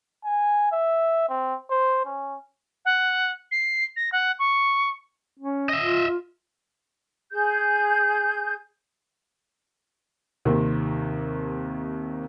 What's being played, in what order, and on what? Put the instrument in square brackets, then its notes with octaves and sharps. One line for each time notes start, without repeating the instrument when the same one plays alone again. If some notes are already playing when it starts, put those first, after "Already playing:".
[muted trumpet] G#5
E5
C4
C5
C#4
[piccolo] F#5
C7
A#6
F#5
C#6
[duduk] C#4
[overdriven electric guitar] D#5 E5
[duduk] F4
F4
[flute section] G#4 G6
[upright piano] D#2 C3 D#3 C4